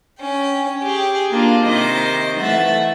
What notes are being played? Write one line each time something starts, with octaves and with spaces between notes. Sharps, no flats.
C#4 G5
G4 G#4
A#3 D4 F4
C3 D#3 C5 D#5 D6
E3 A3 E5 F#5 A6